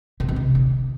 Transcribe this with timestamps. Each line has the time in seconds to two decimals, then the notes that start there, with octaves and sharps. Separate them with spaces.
0.20 C3
0.29 B2
0.36 C3
0.55 D3